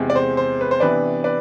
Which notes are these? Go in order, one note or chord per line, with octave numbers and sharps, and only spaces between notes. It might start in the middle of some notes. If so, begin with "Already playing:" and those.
Already playing: E2 C3 G#3
D5
C5
C5
B4
C5
C3 E3 B3 D4 B4 D5
B4 D5